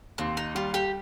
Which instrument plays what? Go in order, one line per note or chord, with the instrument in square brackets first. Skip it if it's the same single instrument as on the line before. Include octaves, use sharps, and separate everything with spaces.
[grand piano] D#2 [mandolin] C4
[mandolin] D#4
[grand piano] G3 [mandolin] F4
[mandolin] G4